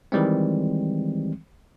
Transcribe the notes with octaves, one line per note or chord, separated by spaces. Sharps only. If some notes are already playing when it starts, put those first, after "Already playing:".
D#3 E3 G3 G#3 C4